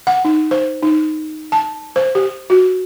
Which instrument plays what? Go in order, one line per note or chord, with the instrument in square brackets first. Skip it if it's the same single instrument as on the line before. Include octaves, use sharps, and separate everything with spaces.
[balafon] F#5
D#4
C5
D#4
A5
C5
G4
F#4